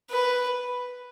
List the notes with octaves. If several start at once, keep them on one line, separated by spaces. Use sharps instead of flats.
B4